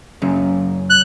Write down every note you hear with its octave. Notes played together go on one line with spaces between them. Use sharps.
F#2 C#3
F#6